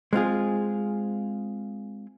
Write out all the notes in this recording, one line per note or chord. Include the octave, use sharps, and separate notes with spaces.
G#3 C4 F4 G#4